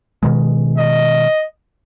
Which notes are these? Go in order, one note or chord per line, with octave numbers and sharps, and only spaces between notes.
B2 D#3 G#3
D#5